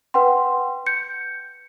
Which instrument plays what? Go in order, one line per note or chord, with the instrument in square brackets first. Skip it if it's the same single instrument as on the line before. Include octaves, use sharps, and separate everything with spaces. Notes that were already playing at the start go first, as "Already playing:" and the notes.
[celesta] B4 F#5 G5 C6
G6 C#7